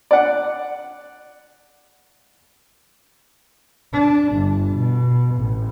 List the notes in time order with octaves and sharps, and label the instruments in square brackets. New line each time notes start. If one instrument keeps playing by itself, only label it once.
[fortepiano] D5 F#5
[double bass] D4
G1
B2
A1